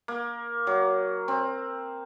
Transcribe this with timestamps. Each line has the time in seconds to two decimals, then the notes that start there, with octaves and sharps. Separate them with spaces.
0.08 A#3
0.67 F#3
1.28 C4